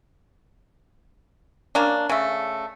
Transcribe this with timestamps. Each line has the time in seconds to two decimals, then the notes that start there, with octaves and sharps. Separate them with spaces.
1.75 A#3 C#4 D4
2.09 C#3 A3